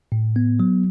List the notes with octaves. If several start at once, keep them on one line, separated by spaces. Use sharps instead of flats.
A2
B3
F#3